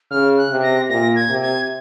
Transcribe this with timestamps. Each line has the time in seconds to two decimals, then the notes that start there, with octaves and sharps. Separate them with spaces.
0.11 C#3 F6
0.38 F#6
0.50 C3
0.63 A#6
0.89 A#2 A#6
1.16 G#6
1.30 C3
1.42 G#6